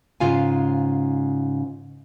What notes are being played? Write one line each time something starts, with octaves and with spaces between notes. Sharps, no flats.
G#2 C#3 F4 F5 G#5